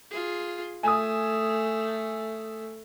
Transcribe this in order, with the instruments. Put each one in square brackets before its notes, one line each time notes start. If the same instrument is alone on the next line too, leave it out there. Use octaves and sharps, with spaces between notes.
[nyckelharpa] F4 G#4
[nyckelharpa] A3 [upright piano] G#5 D#6